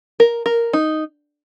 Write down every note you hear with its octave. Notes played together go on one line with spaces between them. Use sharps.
A#4
A#4
D#4